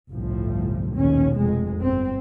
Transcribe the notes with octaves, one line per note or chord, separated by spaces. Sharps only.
G1 C2 A2 C3 F3
A#1 D#2 B2 C#4
F1 F2 G#3
G1 C4